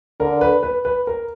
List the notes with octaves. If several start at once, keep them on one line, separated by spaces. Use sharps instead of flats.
D3 A#4
B4
B4
B4
A#4